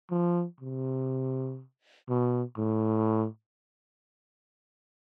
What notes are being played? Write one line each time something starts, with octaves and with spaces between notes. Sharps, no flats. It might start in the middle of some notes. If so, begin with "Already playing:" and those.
F3
C3
B2
A2